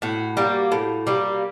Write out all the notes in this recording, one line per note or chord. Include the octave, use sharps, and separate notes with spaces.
A2 F#4
G3 A#3
A2
G3 A#3